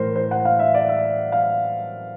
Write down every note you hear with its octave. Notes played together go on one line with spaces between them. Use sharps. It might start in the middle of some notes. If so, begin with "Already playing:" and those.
Already playing: A2 E3 A#4 C5
C5
F#5
F5
E5
D5
E5
F5